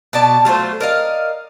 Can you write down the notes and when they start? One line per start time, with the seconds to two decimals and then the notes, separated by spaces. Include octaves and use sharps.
0.13 B2 D5 A5
0.45 F#3 A3 F4 C5
0.80 A#4 D5 D#5 F5